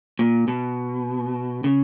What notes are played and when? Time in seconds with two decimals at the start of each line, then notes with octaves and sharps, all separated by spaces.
0.19 A#2
0.48 B2
1.64 C#3